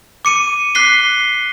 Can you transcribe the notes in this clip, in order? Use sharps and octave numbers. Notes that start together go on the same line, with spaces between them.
D6 C#7 D#7
D6 F#6 B6 C7 G7